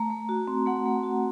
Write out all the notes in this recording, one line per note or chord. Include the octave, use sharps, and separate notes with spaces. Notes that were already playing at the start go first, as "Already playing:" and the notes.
Already playing: A3 A#5
A3
F#4
C4
A3 F#5
A3
F#4